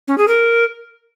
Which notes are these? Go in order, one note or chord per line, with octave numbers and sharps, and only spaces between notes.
C#4
G#4
A#4